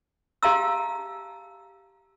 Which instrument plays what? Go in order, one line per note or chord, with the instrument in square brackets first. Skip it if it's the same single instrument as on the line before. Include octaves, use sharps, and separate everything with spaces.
[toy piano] G4 F5 A5 A#5 E6